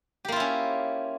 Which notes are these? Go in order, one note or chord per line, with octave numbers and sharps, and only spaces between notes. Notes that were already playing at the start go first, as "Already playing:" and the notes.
A#3 C#4 E4 F4 G4